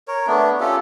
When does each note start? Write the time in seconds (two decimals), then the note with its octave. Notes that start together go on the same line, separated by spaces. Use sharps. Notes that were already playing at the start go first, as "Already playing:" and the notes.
0.08 A#4 C#5
0.27 A3 B3 D4
0.60 C#4 F4 G4 A4